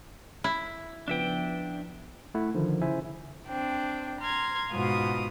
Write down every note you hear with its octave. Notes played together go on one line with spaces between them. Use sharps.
E4
C#3 F3 B3 D4 E5 G5
A3 E4 F#5
D3 D#3 F3
C#3 E4 C5 E5 G#5
C4 D4 G5
A#5 C6 F6 G#6
G#2 B2 F4 D#6